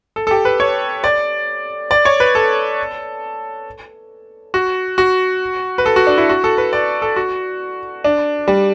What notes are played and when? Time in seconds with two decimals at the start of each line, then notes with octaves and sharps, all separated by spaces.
0.16 A4
0.27 A4
0.31 G4
0.45 B4
0.60 C#5
1.04 D5
1.91 D5
2.05 C#5
2.20 B4
2.35 A4
4.54 F#4
4.98 F#4
5.78 B4
5.86 A4
5.96 F#4
6.07 D4
6.18 E4
6.29 F#4
6.44 A4
6.58 B4
6.73 D5
7.02 A4
7.16 F#4
8.04 D4
8.48 G3